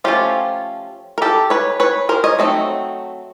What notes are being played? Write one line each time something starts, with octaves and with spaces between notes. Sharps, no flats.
F3 A3 C#4 F4 G4
A#4
G4 A4
B4 C#5
B4 C#5
A#4 C5
C#5 D#5
F#3 A3 C4 D#4